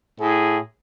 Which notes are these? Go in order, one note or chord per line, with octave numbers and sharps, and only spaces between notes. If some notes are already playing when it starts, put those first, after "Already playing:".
A2 G#4